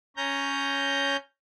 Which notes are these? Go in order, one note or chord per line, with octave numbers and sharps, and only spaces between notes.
C#4 A#5 G6